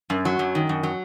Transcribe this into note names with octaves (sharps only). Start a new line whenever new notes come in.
F#2
F#3
F#2
D#3
F#2
F#3